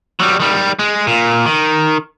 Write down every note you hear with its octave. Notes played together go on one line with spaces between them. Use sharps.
F#3 G3
D#3 G3
G#3
A#2
D#3